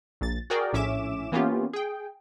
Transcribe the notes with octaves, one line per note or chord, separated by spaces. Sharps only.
A#1 A#2 A6
F#4 G#4 A#4 D5 G5
A#1 A2 C#4 E5 D6 E7
E3 A#3 B3 C#4 F4 G4
G#4 G5